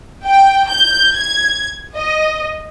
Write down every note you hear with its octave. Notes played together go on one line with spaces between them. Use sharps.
G5
G6
G#6
D#5